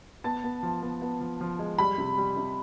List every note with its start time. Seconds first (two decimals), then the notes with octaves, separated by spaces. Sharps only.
0.24 B3 A5
0.44 B3
0.63 F3
0.82 B3
1.02 B3
1.21 F3
1.41 F3
1.59 G#3
1.78 G3 B5
1.98 C3
2.17 G3
2.37 C3